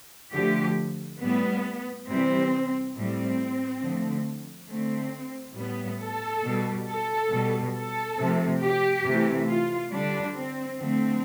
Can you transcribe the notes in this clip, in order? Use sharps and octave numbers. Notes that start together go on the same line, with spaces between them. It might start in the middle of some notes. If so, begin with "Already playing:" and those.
D3 F3 A3 G4
A2 G3 B3
C3 E3 G3 C4
A2 G3 C4
D3 F3 A3
D3 A3 C4
A2 G3 B3
A4
B2 G3
A4
B2 G3
A4
C3 F3 A3
G4
C3 E3 A3
F4
D3 G3 D4
C4
D3 F3 A3 C4